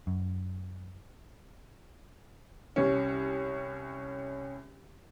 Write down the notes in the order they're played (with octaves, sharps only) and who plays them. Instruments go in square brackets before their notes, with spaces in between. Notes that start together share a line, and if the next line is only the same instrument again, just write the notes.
[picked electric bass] F#2
[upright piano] C2 C#4